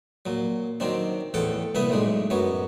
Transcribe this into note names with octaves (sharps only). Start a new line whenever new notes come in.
A#2 F#3
D#3 F#3 C4 D4
E2 A2 A4 F#5 G5
C2 A#2 B3 E4 B5 D#6
B1 A2 G#3 D4
F#2 F#3 B3 C#5